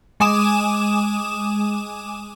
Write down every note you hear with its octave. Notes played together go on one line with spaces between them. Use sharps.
G#3 G#5 D6 D#6 E7